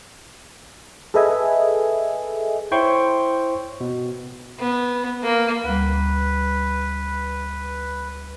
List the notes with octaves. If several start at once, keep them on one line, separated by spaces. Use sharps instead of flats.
G#4 A4 B4 D#5 E5 G#5
E4 C5 C#5 G5 C6 C#6
B2
B3
A#3
D2 G3 B4